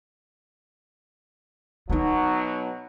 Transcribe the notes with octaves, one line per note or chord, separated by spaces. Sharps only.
B2 F#3 B3 D#4